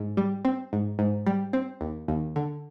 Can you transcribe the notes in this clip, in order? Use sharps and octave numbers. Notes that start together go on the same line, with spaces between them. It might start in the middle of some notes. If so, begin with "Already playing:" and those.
Already playing: G#2
G3
C4
G#2
G#2
G3
C4
D#2
D#2
D3